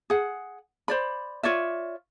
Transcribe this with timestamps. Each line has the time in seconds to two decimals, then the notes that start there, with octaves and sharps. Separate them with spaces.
0.10 G#4 F#5
0.88 C5 D5 B5
1.43 F4 C#5 D5 E5